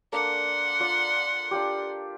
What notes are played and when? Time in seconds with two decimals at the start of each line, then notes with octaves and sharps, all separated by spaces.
0.13 A#3 D4 A4 F#5 C6
0.80 F4 D5
1.51 D4 F4 G4